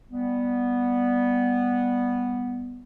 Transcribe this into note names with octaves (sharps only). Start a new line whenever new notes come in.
G3 B3